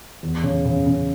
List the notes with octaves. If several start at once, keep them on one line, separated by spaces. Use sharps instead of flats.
E2
C#3
C#3
C#3